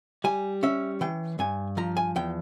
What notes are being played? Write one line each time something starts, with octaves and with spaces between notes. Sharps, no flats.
G3 G#5
C#4 E5
E3 G5
G2 G#5
F3 A#5
G#5
E2 G5